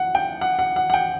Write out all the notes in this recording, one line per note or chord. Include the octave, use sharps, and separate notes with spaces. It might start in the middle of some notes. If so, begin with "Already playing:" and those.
Already playing: F#5
G5
F#5
F#5
F#5
F#5
G5